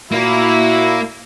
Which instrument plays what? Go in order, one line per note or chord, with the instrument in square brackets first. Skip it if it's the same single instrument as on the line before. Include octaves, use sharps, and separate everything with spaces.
[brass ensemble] A#2 E4 [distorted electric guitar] A#3 [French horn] F#4